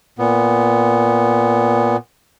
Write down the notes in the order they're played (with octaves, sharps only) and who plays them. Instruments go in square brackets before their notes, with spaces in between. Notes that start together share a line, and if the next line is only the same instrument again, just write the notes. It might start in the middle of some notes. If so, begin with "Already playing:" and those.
[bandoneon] A#2 B3